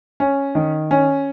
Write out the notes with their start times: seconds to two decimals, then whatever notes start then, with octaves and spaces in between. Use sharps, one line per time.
0.20 C#4
0.55 D#3
0.91 C#4